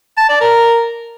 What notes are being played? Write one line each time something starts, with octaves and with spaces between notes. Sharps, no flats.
A5
D5
A#4